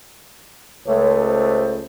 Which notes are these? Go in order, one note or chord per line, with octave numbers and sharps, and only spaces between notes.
C#2 A3 C#5
C5